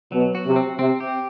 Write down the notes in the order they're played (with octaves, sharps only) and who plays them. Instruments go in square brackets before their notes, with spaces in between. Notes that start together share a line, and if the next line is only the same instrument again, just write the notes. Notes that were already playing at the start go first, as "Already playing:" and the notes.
[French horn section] B2 [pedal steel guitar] F#3
[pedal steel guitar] F#4
[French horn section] C3
[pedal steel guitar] C4
[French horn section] C3 [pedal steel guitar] C4
[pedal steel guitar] G4